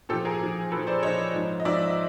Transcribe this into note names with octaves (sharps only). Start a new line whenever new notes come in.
A#2 F3 G4 A4
G#4 A#4
A#2 F3
A#2 F3 A4 B4
C5 D5
A#2 F3 C#5 D#5
G#2 F3
D#5
G#2 F3 D5 E5